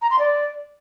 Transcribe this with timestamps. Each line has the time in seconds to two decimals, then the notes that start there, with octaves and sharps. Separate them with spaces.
0.02 A#5
0.10 C6
0.19 D5